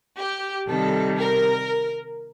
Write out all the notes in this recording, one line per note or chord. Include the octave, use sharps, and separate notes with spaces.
G4
C3 D#3 G3 A4
A#4